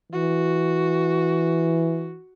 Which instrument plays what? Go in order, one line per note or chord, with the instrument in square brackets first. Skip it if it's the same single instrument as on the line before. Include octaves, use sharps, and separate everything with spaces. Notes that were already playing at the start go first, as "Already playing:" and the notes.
[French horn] E3 [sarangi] F#4